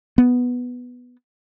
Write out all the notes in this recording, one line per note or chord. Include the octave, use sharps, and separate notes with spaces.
B3